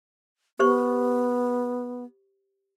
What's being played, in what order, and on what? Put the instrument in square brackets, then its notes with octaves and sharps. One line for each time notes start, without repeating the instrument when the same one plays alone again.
[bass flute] B3 [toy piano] G4 C5 C#6